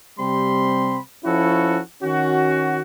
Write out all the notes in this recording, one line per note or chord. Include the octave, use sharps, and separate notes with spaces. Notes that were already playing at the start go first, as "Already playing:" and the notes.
C3 G3 C4 B5 C6
F3 C#4 E4 F#4 A4
D#3 C#4 F#4